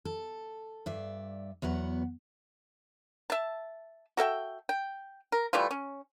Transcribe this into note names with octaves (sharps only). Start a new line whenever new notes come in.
A4
G2 D5 E5
E2 F#3 B3 F#5
E5 A5
F#4 A4 E5 G5
G5
A#4
E3 G3 A3 F4
C#4